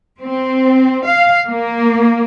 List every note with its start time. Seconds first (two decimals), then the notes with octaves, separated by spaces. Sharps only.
0.22 C4
1.07 F5
1.47 A#3